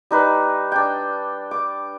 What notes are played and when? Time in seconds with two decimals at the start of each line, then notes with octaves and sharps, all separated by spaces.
0.11 G3 D#4 B4
0.72 D4 G5
1.51 D6